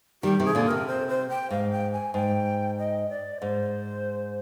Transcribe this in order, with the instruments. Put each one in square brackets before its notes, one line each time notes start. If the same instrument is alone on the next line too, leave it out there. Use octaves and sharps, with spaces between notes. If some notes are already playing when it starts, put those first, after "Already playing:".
[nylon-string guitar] D#3 G3 [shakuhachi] G4
[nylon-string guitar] C3 D#3
[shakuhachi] G#4
[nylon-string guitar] A#2 D3
[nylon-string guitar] C3 [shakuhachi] A#4
[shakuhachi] C5
C5
G5
[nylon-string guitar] G#2 [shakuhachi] F5
[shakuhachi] G5
G#5
[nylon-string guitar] G#2 [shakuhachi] G5
[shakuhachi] D#5
D5
[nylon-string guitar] G#2 [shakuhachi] C5